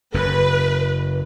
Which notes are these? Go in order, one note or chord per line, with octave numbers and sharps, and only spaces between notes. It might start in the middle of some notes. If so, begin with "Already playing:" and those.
F#1 F#2 B4